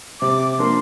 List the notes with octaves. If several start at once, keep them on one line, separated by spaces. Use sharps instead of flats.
C3 D6
F3 A#3 D4 A#4 C6